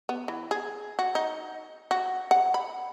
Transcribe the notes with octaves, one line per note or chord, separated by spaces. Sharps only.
B3
E3
G#4
F#4
D#4
F#4
F#5
B5